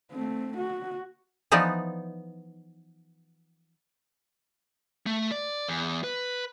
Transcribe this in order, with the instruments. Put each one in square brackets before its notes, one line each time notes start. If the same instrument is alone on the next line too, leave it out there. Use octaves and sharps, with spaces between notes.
[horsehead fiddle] A3 C4
F#4
[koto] E3 F3 B3 D#4 D5
[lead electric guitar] A3
D5
E2
B4